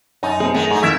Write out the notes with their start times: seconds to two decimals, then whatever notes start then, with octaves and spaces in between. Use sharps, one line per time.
0.23 F#2 D#4 A5
0.40 B3 C4 G#4
0.54 D#3 G#3 A3 G#4
0.71 G#2 G#3 D#4
0.83 F2 D#3 A3 E4 E5